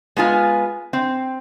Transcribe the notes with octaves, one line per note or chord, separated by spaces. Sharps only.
G#3 B3 F4 G#5
C4